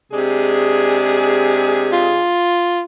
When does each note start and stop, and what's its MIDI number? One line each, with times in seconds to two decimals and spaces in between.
0.12 2.17 48
0.12 2.33 56
0.12 2.33 62
0.12 2.33 68
1.92 2.82 65